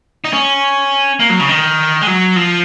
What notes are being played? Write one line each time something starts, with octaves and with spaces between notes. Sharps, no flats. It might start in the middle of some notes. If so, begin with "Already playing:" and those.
D#4
C#4
A#3
F#3
C#3
D#3
G#3
F#3
F3